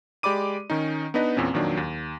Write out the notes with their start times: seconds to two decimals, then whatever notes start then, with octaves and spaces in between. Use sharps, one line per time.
0.23 G#3 G4 D5 B5 D6 D#7
0.70 D#3 C#4 D#4
1.14 B3 D4 D#4 B4 D#5
1.37 E2 A#2 C4 C#4
1.53 F2 A#2 D#3 F#3 D4
1.77 D#2